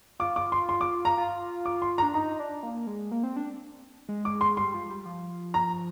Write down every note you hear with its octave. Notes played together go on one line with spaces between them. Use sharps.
F4 D6
D6
C6
C6
D6
A#5
F4
D6
C6
A#5
D4
D#4 A#5
D4
A#3
G#3
A#3
C4
D4
G#3
D6
C6
G3 C6
F3
G3
F3
A#5